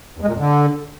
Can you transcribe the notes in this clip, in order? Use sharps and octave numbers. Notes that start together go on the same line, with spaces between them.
E2
G#3
A#2
F2
D3